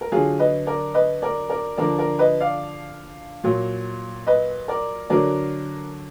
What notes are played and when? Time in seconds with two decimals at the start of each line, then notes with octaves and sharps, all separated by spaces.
0.01 A#4
0.12 D3 F#3 F4 G#4
0.39 B4 D#5
0.66 A#4 D5
0.94 B4 D#5
1.22 A#4 D5
1.50 A#4 D5
1.77 D3 F3 A#4 D5
1.98 A#4 D5
2.19 B4 D#5
2.40 D5 F5
3.44 A#2 F#3
4.27 B4 D#5
4.68 A#4 D5
5.10 D3 F#3 A#4 D5